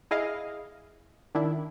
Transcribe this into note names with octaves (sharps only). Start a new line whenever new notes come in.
E4 G#4 D#5 F5
D#3 D4 E4